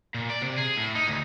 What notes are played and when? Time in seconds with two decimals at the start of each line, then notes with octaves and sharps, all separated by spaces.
0.14 A#2
0.30 D5
0.42 C3
0.58 G#4
0.77 A2
0.95 D#4
1.08 D2